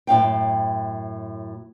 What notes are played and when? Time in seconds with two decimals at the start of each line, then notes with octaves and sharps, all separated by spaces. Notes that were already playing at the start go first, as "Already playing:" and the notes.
0.07 F#2 A2 F5 G5